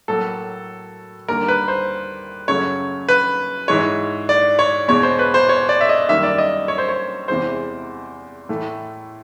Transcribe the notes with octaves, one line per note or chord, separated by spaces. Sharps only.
A2 F#3 A#3 A4
D#2 D3 G3 A#3 A#4
B4
C5
F#2 C#3 F#3 A3 C#5
B4
G#2 E3 G#3 C#5
D5
C#5
E2 B2 G#3 C#5
C5
B4
C5
C#5
D5
E5
D#5
F#2 D#3 G3 A#3 E5
D5
D#5
C#5
C5
C#5
E2 C3 E3 G#3 C5
A2 E3 A3